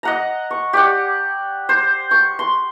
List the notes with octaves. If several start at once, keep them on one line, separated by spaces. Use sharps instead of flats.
D#5 F#5 A#5
C#6
G4 D5 F#5
C5
C#6
C6